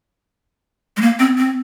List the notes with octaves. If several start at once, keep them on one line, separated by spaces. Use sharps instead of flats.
G#3
A#3
C4
C4